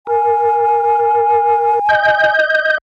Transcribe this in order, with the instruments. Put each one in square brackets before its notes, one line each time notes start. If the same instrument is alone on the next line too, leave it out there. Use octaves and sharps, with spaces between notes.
[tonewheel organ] A#4 [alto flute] G#5
[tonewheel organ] D#5 G6